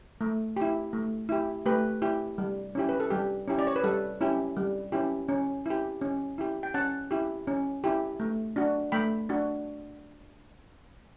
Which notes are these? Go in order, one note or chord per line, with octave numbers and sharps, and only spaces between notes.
A3
E4 G4
A3
E4 G4
A3 G4 B4
E4 G4
G3
C#4 E4 G4
B4
A4
G3 G4
C#4 E4 G4
D5
C#5
B4
G3 A4
C#4 E4 G4
G3
C#4 E4 G4
C#4
E4 G4
C#4
E4 G4
G5
C#4 F#5 A5
E4 G4
C#4
E4 G4
A3
D4 F#4
A3 G5 B5
D4 F#4